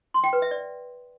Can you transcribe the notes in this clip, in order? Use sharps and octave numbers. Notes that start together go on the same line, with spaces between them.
C6
G5
B4
E5
D5